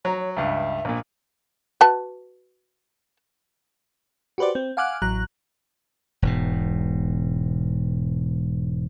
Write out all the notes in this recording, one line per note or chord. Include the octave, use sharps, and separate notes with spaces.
F#3 A#5
C#5
C#2 G2 E5
A#1 A#2
F#4 B4 A5
F#4 G4 B4 C5 D5
C4
F5 F#5 G#5 D6 F6 F#6
A1 F#3 A#5 F#6
E1 G#2 B2